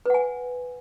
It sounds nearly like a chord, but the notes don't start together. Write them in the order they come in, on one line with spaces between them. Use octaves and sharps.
B4 F#5 G#5